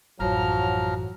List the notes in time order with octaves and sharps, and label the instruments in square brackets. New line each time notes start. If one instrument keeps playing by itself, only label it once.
[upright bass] A1 F#2 [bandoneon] F3 A#5 F6 [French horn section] F#3